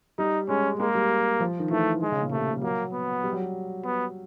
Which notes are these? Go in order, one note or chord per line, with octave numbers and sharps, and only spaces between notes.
G3 D#4
G#3 C#4
G#3 A#3
G3
F3
D#3
E3 A3
D#3 G#3
C#3
A#2
C3 A3
G3
F#3 A#3
B3
G3
F#3
G3
B3